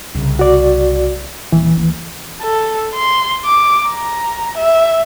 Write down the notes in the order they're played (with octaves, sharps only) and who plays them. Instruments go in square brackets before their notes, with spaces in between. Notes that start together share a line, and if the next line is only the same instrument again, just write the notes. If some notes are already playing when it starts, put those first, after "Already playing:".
[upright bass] C2 C#3
[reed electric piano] F#4 D5
[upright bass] D#1 [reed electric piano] E3
[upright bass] D2 A#3
[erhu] A4
C6
D6
A#5
E5